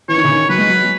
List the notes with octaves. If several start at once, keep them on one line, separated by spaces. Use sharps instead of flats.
E3 C#5
D#3
C#3
D#3
F#3 B4
G#3
F#3
F#3